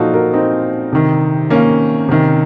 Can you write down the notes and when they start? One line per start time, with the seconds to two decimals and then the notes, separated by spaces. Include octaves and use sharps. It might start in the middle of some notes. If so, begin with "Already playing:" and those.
Already playing: A#2 F3 D#4 F4 F#4 A4
0.14 F#4 A#4
0.33 C4 D#4
0.92 C3 D#3
1.50 A#3 C#4
2.09 C3 D#3